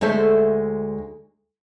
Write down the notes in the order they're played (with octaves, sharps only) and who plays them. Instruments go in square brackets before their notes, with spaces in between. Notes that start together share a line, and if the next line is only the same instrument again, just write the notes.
[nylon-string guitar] D2 G#3 A3 A4 C5 E5